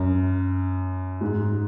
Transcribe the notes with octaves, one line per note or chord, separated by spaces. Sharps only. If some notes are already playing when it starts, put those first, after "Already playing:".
Already playing: F#2
G#2